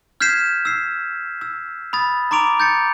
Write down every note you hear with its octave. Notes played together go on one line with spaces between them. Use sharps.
F6 G6 G#6 B6 C7 E7
E6 C7
E6
B5 D#6 A6
A#5 C6 D6 D7 F7
G6 A6 C#7